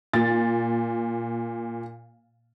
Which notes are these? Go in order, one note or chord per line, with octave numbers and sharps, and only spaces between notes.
A#2 A6